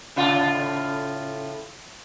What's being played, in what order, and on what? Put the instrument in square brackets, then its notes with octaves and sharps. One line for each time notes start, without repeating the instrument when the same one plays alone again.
[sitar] A2 C#3 F4